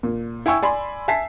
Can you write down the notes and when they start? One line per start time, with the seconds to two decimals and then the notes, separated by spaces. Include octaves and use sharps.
0.03 A#2
0.46 E4 G5 G#5 C#6 E6
0.63 D5 G#5 B5 C6
1.08 E5 G#5 A5 B6 C7